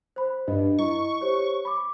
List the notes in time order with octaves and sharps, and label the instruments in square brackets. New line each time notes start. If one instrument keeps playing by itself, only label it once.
[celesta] C5 B5
[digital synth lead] G2 [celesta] D#5
[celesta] E4 D#5 [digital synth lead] C#6
[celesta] G4 C5 C#5
B5 D6